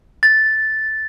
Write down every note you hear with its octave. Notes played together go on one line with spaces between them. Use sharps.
A6